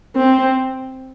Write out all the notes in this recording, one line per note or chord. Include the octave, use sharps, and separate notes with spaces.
C4